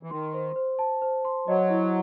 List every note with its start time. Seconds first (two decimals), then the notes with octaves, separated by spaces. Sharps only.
0.03 E3
0.11 D#3 C6
0.34 C5
0.56 C5
0.79 A5
1.02 C5
1.25 C6
1.48 F#3 D#5
1.70 E4